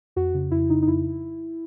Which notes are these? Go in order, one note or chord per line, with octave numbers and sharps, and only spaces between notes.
F2 F#4
C#3
F2 E4
C#3 D#4
D#4
F2 E4